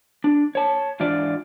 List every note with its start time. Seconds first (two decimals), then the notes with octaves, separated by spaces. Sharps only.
0.24 D4
0.55 C#5 A5
1.00 G#2 E3 D4 F4 D5